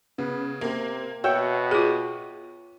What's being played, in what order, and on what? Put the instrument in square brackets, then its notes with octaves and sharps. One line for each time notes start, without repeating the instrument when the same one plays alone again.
[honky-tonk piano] C#3 [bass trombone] B3
[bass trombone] C3 [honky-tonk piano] A#3
[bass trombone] B2 [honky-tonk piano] F#4 [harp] C#5 E5 G5
[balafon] F4 G#4 [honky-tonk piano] D#7